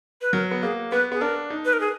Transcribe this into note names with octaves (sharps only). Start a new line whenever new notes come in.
B4
F#3 A#4
B3
A#3 G#4
B3 B4
B3 G#4
D4 A#4
D#4
B4
A#4
G#4